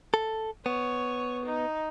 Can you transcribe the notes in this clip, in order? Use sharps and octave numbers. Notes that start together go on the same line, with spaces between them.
A4
B3 C#5
D#4